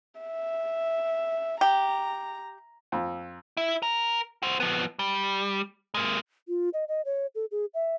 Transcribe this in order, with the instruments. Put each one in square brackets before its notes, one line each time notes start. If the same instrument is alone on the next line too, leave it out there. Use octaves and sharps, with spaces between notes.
[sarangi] E5
[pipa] G4 [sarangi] A#5
[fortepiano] F2
[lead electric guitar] E4
A#4
F#4 C5
F3 B3
G3
G#3 A#3
[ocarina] F4
D#5
D#5
C#5
A4
G#4
E5